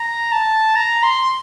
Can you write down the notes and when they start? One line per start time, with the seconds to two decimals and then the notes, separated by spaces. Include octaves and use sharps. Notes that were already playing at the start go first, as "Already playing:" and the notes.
Already playing: A#5
0.32 A5
0.76 A#5
1.03 C6